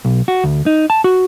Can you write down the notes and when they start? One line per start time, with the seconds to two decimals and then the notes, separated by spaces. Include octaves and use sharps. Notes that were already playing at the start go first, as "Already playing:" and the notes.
0.05 B1
0.28 F#4
0.44 D2
0.66 D#4
0.90 A5
1.04 F#4